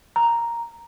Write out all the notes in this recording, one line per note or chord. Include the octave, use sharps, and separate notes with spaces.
A#5